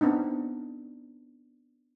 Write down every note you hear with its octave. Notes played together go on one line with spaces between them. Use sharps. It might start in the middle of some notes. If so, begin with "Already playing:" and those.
B3 C4 D4 D#4